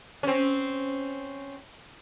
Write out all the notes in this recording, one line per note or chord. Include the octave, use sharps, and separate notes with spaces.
C4 C#4